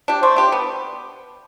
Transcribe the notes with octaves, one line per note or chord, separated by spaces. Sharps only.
D4 G4
A3 C5
D4 G4
B3